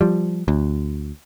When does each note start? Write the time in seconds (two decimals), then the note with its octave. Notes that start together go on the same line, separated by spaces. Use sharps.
0.01 F3 G3
0.48 D2